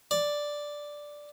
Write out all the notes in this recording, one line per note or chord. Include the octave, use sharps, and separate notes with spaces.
D5